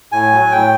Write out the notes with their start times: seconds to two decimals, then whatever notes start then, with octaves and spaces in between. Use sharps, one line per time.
0.12 A2 G#5
0.32 F#3
0.51 A2 G5